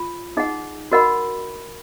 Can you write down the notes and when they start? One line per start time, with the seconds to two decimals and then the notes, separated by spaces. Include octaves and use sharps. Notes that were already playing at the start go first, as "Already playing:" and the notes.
Already playing: F4
0.37 D#4 G#4 D#5 F#5
0.92 F#4 A#4 D#5 F#5 B5